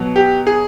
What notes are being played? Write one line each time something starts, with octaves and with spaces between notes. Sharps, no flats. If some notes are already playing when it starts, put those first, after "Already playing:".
Already playing: B2 F#3
G4
G#4